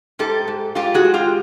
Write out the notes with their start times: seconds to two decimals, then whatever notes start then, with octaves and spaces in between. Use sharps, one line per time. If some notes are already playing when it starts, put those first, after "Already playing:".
0.19 G#2 G4 A4
0.48 G#2
0.75 G#2 F4 G4
0.94 F#4 G#4
1.04 G#3
1.14 F4 G4